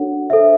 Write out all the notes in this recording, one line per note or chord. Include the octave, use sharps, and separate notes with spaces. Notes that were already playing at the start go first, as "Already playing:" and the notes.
Already playing: D4 F#4 A4 C#5 F#5
A4 C5 E5